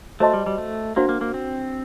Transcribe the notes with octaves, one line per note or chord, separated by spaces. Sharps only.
A3 F#4 C5 D#5 A5 C6
G3
G3
A3
A#3 D4 F#4 C5 F#5
A#3
A#3
C4